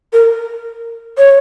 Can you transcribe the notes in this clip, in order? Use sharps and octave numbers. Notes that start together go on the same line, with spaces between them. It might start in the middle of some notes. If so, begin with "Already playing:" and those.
A#4
C#5